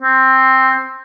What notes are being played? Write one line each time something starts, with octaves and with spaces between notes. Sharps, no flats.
C4